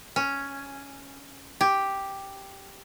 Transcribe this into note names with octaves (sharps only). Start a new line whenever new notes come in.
C#4
G4